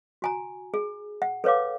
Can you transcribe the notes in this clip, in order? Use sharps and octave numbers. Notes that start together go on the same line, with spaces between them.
F#4 G#5 A#5
G#4
F#5
A4 B4 C#5 F5 D6